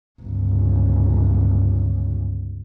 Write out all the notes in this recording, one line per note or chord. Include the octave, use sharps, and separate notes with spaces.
G1 C#2